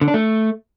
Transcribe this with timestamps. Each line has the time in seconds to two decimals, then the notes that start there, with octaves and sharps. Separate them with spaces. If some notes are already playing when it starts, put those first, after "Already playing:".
0.01 D3
0.08 D4
0.14 A3